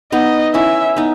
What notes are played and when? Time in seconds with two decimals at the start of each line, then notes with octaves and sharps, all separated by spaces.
0.12 B3 D#4 D#5
0.54 C#4 E4 E5
0.96 B3 D#4